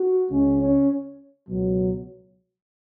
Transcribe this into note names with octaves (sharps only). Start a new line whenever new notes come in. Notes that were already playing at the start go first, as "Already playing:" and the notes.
Already playing: F#4
C#2 C#3 G#3 C#4
C#4
C#2 B2 F#3